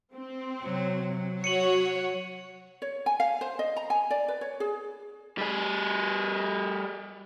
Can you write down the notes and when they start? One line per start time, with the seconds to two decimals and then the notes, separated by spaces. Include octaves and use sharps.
0.14 C4
0.63 C3 F#3
1.12 F#3
1.44 F#4 C#5 C#7 D#7 F#7
2.82 C#5
3.06 G#5
3.20 F5
3.41 C5
3.59 D#5
3.77 A#5
3.90 G#5
4.11 D5
4.28 B4
4.41 C#5
4.60 G#4
5.38 G3 G#4